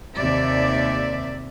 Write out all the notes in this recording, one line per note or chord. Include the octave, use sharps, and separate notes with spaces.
D#2 C3 D5 E5